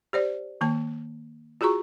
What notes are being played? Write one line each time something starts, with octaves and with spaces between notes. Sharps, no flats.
G4 C5 D5
D#3 A#3 A5
F4 F#4 G#4 A#5 C#6